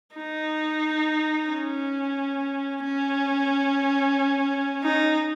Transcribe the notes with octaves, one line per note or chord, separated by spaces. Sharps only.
D#4
C#4
C#4
D#4